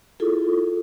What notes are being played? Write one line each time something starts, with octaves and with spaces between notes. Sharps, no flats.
E4 F4 G#4 A4